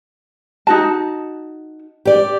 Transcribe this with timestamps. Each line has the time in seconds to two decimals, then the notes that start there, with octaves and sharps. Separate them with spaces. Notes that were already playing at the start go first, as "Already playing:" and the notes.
0.67 D#4 F#4 A5
2.05 G4 D5